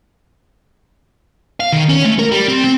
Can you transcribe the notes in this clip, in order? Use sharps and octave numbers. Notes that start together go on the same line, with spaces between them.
F5
D#3
C#4
A3
A#4
G3
C4
C4